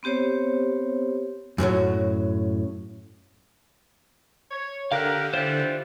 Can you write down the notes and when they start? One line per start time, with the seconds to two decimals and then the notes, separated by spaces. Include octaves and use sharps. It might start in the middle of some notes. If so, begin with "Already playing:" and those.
0.03 B3 C4 G4 C5 C#5
1.58 F#2 A2 E3 F#3
4.51 C#5
4.92 D3 G4 A#4 F5 F#6
5.34 E3 G3 F4 C5 F#6